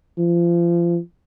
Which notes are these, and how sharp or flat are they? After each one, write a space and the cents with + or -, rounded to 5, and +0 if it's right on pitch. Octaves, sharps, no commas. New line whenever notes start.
F3 -30